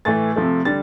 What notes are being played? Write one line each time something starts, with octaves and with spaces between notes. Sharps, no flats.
A2 E3 A3 A6
C3 F3 A3
D3 G3 A6